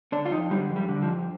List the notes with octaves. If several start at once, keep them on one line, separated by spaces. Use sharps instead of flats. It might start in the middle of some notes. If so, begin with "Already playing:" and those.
D3 D4
F4
F2 D#4
D3 G3
F2
G3
D3
F3
F2